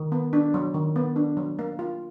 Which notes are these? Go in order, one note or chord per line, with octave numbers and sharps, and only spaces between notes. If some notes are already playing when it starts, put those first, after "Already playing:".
Already playing: D#3
B3
D4
F#3
D#3
B3
D4
F#3
A#3
F4